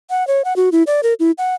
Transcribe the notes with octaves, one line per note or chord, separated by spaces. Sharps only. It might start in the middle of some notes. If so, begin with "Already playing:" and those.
F#5
C#5
F#5
F#4
E4
D5
A#4
E4
F#5